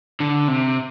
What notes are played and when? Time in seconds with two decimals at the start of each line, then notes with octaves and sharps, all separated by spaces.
0.20 D3
0.48 C3